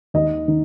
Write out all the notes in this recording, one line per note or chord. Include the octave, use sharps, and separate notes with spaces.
D#2 D#5
D#3